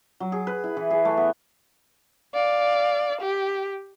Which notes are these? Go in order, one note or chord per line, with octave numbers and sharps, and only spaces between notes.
F#3
G#4
B4
E4
E3
G#4
A3
B3
D5 F5
G4